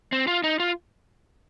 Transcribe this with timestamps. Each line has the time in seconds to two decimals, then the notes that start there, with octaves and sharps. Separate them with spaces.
0.12 C4
0.27 F4
0.44 D#4
0.60 F4